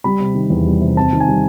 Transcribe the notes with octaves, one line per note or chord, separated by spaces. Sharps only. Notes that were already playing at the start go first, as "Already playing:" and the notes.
G3 B5
C3
D#3
E2
G3
C3
C4 A5
D#3
G#5
G3